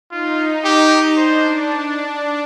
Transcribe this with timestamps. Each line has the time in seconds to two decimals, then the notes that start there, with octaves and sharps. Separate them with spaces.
0.11 D#4 F4
0.64 G4
1.17 D4 C5